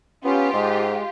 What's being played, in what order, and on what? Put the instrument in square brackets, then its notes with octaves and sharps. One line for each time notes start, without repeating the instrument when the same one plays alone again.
[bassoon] B3 [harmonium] C#4 [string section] F4 G4
[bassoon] G#2 [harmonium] G#3